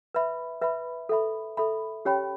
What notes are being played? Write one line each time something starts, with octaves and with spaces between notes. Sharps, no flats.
B4 E5 B5
B4 E5 B5
A4 E5 B5
A4 E5 B5
C#4 G4 C#5 G5 B5